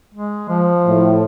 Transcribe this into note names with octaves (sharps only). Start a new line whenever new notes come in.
G#3
F3
A2